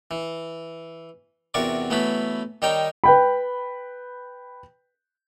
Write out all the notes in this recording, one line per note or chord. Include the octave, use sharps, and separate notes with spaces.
E3
E2 C3 F#4 A#4 D5 C#6
E3 F#3 A3 B3 F#4 B5
D#3 G3 D#4 C#5 G5 A#5
B4 G5 B5